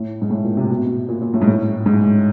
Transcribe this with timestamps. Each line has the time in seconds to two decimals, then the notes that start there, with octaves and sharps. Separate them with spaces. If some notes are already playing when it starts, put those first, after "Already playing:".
Already playing: A2
0.22 G#2
0.30 A2
0.44 A#2
0.57 C3
0.69 B2
1.09 A#2
1.22 A#2
1.34 A2
1.41 G#2
1.47 A2
1.86 G#2